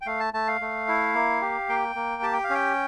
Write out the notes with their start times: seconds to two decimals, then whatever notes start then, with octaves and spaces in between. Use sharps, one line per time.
0.01 G5
0.06 A3 F5
0.20 A5
0.34 A3 A5
0.48 F5
0.61 A3
0.88 E4
1.14 A#3
1.41 G4
1.69 A#3 G5
1.95 A#3
2.22 G4 A5
2.33 G5
2.44 F5
2.50 C#4 G5